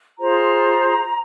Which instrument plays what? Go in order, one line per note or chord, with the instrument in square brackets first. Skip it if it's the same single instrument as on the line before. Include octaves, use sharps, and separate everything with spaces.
[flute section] F4 G#4 C5 A#5